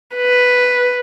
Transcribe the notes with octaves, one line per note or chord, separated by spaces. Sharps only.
B4